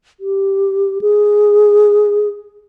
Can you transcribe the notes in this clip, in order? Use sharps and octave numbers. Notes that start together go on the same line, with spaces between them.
G4
G#4